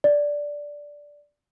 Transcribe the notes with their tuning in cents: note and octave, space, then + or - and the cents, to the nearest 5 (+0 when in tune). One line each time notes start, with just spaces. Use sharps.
D5 -5